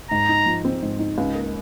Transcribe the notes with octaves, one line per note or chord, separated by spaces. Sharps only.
G#2 A#5
D#4
F3
C4
G#2
D#4
C#2
A#3